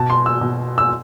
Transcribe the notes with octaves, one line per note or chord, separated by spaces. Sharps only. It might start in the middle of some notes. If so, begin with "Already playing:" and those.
Already playing: B2 A5
C6
E6
B2
E6